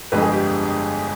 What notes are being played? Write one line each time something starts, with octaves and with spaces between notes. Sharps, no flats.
G1 F2 D3 G#3 B4
G#4
G4